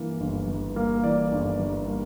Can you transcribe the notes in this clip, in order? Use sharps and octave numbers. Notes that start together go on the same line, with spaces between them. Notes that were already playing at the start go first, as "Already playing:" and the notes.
Already playing: G2 E3 A#3
G1
G2
A#3
E3 D5
G1
G2
A#3